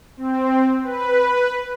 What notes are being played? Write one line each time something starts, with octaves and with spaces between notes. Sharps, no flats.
C4
B4